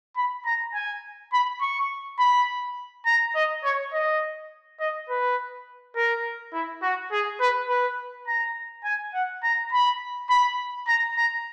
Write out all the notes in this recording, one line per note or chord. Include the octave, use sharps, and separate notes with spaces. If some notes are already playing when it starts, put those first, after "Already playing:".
B5
A#5
G#5
B5
C#6
B5
A#5
D#5
C#5
D#5
D#5
B4
A#4
E4
F#4
G#4
B4
B4
A#5
G#5
F#5
A#5
B5
B5
A#5
A#5